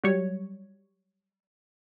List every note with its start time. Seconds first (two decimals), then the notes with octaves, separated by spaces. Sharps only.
0.04 F#3 G3 C#5